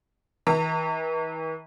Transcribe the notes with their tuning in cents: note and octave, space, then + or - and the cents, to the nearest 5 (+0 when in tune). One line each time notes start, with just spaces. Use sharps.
E3 -45 A#5 -45